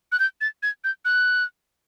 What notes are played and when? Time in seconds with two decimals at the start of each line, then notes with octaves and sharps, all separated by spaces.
0.12 F#6
0.19 G6
0.41 A6
0.63 G#6
0.84 G6
1.05 F#6